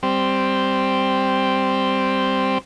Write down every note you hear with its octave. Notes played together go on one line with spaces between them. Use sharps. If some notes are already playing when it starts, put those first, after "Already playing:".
G3 C4